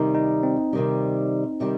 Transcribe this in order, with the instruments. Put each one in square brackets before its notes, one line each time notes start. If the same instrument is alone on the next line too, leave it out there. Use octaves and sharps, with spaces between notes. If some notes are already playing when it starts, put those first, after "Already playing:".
Already playing: [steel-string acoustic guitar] C3 D#3 G3 [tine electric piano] D#4
[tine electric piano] D#4
C4
[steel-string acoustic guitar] C3 D#3 G3
C3 D#3 G3